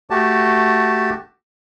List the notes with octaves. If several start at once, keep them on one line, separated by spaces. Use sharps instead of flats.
A3 F#4 G4 A5